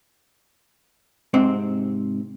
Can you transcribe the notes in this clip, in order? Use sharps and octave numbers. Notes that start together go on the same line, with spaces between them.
G#2 C3 C4